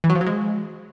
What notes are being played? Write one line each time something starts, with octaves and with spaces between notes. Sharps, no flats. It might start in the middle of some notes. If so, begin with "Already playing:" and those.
E3
F#3
F3
F#3
G#3